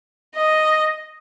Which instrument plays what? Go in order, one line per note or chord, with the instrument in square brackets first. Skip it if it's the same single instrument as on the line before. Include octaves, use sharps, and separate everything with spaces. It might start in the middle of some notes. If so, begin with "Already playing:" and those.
[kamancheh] D#5